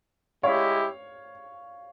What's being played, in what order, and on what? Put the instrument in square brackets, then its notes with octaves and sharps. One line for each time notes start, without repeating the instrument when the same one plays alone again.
[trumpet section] G#3 E4 G4 [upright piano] C#5 F5